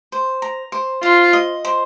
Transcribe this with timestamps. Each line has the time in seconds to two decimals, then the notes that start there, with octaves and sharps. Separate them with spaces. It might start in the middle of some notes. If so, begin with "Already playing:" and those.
0.12 C5
0.42 A#5
0.72 C5
1.03 F4 C5
1.33 D#5
1.65 C5